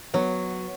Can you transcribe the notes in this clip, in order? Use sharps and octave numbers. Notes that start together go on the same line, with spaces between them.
F#3 B3